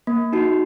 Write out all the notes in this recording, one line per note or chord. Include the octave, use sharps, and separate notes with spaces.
A#3
D#4 F#4